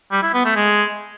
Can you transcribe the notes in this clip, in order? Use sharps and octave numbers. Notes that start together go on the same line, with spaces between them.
G3
E4
B3
A3
G#3